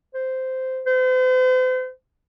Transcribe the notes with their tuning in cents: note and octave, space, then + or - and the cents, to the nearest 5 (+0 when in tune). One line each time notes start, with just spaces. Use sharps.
C5 -10
C5 -40